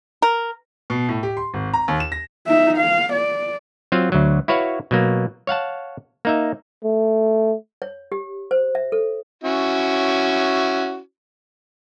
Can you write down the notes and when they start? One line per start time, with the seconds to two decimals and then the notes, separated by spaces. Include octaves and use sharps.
0.22 A#4
0.90 B2
1.09 A2
1.23 G4
1.37 C6
1.54 G#1
1.73 A#5
1.88 D#2
2.00 E7
2.12 A#6
2.47 D#4 E5
2.77 F5
3.13 D5
3.92 F#3 C4 F4 F5
4.12 D2 F#3
4.48 E4 F#4 B4 C#5 F5
4.91 B2 F#3 A#3
5.47 C#5 F5 F#5 A5
6.25 A#3 D#4 E5
6.84 A3
7.82 C#5
8.12 G4
8.51 C5
8.75 E5
8.92 A4
9.44 C#4 E4 F#4